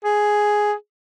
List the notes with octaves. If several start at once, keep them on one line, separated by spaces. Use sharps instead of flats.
G#4